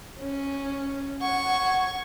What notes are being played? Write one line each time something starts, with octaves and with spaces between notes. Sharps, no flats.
C#4
F#5 C#6 G#6